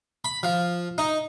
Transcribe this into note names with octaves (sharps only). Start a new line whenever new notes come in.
B5
F3
D#4